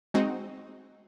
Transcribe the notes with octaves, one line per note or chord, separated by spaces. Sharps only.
G#3 C4 D#4 F#4